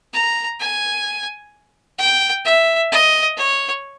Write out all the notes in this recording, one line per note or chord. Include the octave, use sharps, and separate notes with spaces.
A#5
G#5
G5
E5
D#5
C#5